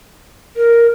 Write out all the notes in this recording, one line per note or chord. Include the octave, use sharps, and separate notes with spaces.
A#4